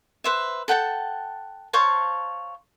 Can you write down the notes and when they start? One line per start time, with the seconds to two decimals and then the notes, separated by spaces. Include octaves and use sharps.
0.24 B4 C5 E5
0.68 A4 F#5 G5 A5
1.73 C5 C#5 F5 A5